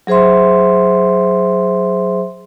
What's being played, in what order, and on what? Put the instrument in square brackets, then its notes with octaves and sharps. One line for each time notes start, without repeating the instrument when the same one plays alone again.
[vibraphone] F#3 G#4 C5 E5 C6